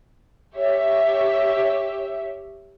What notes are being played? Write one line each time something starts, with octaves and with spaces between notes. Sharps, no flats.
G4 C#5 E5